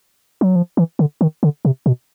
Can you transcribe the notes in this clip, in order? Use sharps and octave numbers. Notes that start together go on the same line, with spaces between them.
F#3
F3
E3
D3
D#3
D3
C3
B2